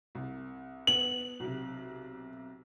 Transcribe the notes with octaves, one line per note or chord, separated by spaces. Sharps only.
C2
B3 F#7
B1 C3